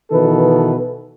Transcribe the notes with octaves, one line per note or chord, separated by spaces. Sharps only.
B2 D#3 E3 A4 B4